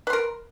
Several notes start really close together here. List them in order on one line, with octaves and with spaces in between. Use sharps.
B4 C6 A#4